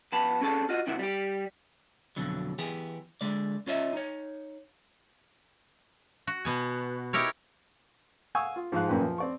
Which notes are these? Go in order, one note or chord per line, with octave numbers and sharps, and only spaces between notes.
F2 B3 A5 B5
C4 C#4 G#4 A4 A5
F4 F#4 D#5
C3 D#3 C4 E4 F#4 E5
G3 G4
F2 B2 D3 F#3
E3 B3 G4 G#4
D3 G#3 D5
C#4 F4 C#5 D#5 E5
D#4 C#5
F#4
B2 B3 G#5
D#4 E4 G4 A#4 C#5
F5 F#5 G#5 C#6 D#6 E6
F4
G#2 F3 G#3 G#4 F5 F#6
F#2 A#2 A#3 B4 G5
F3
C4 D5 C#6